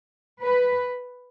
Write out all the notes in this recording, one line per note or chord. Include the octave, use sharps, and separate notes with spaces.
B4